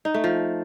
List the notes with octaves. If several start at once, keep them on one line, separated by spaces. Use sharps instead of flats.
D#4
A3
F3